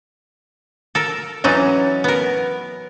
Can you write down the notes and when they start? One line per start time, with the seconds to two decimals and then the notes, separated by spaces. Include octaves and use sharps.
0.95 A4 A#4
1.44 E3 F#3 C#4 D#4 A6
2.04 B3 A#4